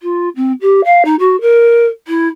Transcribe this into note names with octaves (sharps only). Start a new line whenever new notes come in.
F4
C4
G4
F5
D#4
F#4
A#4
E4